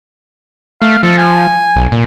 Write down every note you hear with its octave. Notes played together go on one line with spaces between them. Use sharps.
A3 F5
F3 A4
G#5
B1
A#2